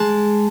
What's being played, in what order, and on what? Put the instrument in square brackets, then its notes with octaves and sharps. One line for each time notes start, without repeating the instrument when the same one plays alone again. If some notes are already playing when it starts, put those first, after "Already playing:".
Already playing: [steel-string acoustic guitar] G#3 A5